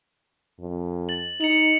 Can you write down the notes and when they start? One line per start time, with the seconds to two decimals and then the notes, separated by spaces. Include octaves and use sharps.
0.60 F2
1.09 A6 F#7
1.41 D#4 C#7 F7 F#7